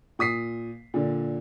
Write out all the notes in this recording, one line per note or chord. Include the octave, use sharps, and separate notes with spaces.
A#2 D#6 B6 C7
A#2 D3